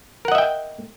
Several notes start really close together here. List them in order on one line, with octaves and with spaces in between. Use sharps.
A#4 F#5 D#5 E5 G5